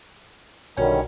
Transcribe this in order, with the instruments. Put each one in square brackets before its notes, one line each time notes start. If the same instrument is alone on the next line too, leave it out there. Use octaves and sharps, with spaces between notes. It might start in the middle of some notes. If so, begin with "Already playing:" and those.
[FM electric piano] B1 F#4 A#4 [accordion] D3 D#3 G3 [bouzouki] C#4 [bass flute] C#5